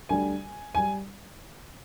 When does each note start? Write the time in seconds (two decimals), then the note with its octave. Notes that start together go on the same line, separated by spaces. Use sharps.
0.09 D2 D3 G3 G#5
0.75 G3 G#5